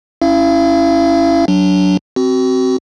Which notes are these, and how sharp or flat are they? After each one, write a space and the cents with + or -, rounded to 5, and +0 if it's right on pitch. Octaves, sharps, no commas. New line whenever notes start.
C#4 +0 E4 +0 F5 -45
F#3 +0 D4 -15
C4 +0 F#4 +30